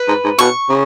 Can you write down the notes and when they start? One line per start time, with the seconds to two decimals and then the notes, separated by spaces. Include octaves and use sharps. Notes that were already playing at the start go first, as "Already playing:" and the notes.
Already playing: B4
0.08 G#2
0.24 G#2
0.39 B2 C#6
0.69 C#3